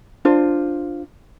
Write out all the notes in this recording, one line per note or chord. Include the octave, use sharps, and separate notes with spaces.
D4 F4 C5